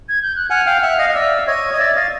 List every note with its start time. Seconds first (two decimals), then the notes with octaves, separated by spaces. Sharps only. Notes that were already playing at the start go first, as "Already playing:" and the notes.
0.09 G#6
0.22 G6
0.36 F#6
0.50 F#5 G#5 F6
0.66 F5 G5
0.83 E5 F#5
0.99 D#5 F5
1.09 D#5
1.15 D5 E5 E6
1.38 E5
1.47 C#5 D#5 G#6
1.73 D#5
1.79 D5 E5 A6
1.96 D#5 F5 A6